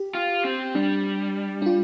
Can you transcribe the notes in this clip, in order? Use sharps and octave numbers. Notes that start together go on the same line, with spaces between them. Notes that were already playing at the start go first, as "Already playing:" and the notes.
Already playing: G4
F4
C4
G3 D4
D4
F4